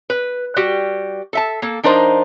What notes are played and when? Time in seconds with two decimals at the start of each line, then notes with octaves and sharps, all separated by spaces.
0.10 B4
0.56 G3 F#4 G4
1.33 A4 E5 A5
1.62 A#3 A4
1.83 F3 D4 D#4 A#4 C5